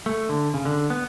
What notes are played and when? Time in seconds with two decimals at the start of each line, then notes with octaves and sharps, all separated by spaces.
0.06 A3
0.29 D3
0.54 C#3
0.65 D3
0.90 B3